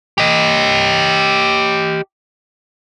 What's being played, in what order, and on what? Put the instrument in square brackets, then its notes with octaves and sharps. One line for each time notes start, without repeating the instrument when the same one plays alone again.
[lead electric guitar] G4 D#5